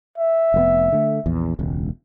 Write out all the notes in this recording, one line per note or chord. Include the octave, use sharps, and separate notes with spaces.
E5
F1 A#2 B3
D3 A3
A#1 E2
E1 C#2